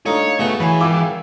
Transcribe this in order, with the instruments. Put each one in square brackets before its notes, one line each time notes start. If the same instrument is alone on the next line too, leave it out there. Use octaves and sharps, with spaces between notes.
[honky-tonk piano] A3 D4 F4 [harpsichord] D#4 [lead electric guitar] C#5
[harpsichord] C#3 F#4 [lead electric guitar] A3 [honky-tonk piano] B3
[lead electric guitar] E3 [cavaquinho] G#4 C#5 B5
[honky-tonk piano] G#1 F4 E6 [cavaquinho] G#4 G5 D6